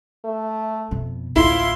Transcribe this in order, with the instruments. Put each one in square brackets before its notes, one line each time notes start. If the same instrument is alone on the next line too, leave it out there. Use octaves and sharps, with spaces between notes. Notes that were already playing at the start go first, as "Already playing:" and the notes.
[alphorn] A3
[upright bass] F2 B2
[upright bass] A1 D2 [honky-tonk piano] E4 [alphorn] F4 [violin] C6